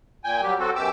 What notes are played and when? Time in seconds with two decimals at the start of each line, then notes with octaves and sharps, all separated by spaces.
0.24 A#2 G5 G#5
0.42 F#3 G3 G4
0.59 F#3 C4 F#4 A4
0.75 F#2 B2 G4 D6 E6